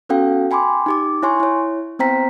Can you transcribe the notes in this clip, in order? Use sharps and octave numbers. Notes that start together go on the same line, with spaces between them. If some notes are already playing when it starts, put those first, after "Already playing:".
B3 C#4 F#4 A4 F5 G5
G5 G#5 B5 C6 D6
D#4 G4 D6
E4 C#5 G#5 C6 C#6
E4 C#5
B3 C4 C5 G5 A#5 B6